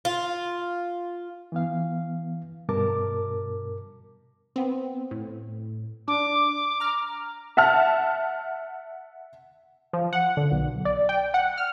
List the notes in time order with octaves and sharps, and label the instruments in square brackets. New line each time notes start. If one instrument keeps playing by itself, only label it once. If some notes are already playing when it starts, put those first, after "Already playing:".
[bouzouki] F4
[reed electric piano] E3 B3 F5
G2 B2 A#4 A5 D6
[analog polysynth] B3 C4
A2
[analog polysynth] D4 [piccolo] D6
[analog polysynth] A#5 F6
[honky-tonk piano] E5 F#5 A5 F6
[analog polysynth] F3
F#5
D3
B1
D5
G5
F#5
F6